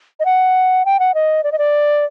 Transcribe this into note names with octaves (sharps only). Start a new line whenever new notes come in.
D#5
F#5
G5
F#5
D#5
D5
D#5
D5